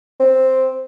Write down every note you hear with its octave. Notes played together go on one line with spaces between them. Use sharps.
C4